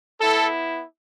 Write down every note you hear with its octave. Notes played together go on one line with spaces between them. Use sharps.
B3 E4 A4